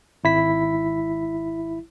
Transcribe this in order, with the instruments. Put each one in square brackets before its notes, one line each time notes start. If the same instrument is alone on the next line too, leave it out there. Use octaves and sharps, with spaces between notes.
[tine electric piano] G#1 E4 B6